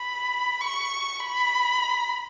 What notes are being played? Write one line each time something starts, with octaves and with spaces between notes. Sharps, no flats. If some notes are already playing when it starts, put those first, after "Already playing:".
Already playing: B5
C#6
B5